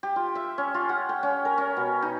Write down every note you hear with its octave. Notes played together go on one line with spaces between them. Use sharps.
G4
F4
E5
C#4
F4
F#5
G5
C#4
A#4
C#4
B2
D#4